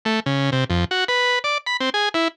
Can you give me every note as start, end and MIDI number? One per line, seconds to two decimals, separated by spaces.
0.05 0.20 57
0.26 0.50 49
0.52 0.64 48
0.70 0.85 41
0.91 1.04 66
1.08 1.39 71
1.44 1.58 74
1.67 1.77 83
1.80 1.90 60
1.94 2.09 68
2.14 2.28 64